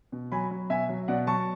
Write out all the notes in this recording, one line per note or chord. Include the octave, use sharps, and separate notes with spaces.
B2
F#3 G#5 B5
F#3
B2 E5 G#5
F#3
B2 D5 F#5
F#3 A5 C#6